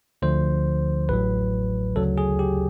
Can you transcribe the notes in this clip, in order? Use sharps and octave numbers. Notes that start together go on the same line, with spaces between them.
D2 D3 F3 C5
A1 A2 F#3 B4
D2 C#3 F#3 A4
G#4
G4